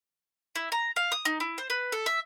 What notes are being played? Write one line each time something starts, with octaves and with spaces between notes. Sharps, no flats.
E4
A#5
F5
D#6
D#4
E4
C5
B4
A4
E5